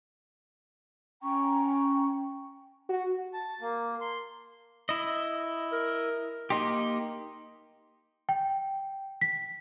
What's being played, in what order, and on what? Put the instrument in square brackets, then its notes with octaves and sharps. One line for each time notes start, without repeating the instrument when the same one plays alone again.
[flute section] C#4 G5 A#5 C#6
[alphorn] F#4
[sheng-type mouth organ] A5
A#3
C6
[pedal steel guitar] E4 D#5
[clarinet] A#4
[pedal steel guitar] A#3 D#4 G4 [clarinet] C6
[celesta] G5
B6